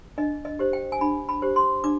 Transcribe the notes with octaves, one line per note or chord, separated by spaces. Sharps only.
D4 D#5
D#5
G4 C5
G5
G#5
D4 B5
B5
G4 C5
C6
D4 D6